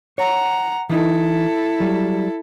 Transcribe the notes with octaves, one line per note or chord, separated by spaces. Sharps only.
C#5 F#5 A#5
E3 D#4 E4 A4
F#3 G3